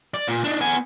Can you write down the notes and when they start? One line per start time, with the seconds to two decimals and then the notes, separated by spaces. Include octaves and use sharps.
0.14 D5
0.28 A#2
0.44 D4 D#4
0.61 B3 G#5